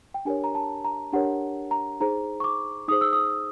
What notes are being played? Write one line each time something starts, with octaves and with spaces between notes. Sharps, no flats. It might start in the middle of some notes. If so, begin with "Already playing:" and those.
G5
D4 G4 A#4 C#5 G#5
A#5
A5
A#5
D4 G4 A#4 C#5 F#5
A#5
D#4 G#4 C5 A#5
C#6
D6
D#4 G#4 C5 D#6
E6
D#6